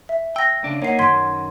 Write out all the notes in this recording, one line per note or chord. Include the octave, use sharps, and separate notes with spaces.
E5
G5 E6 A#6
C#3 D4
A#3 D#4 C#5 F#5 C7
F#2 D#3 C6 G#6 B6